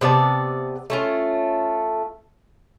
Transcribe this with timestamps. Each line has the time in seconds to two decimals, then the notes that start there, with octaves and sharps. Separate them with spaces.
0.01 C3 B3 D5 A5
0.90 A3 C#4 F4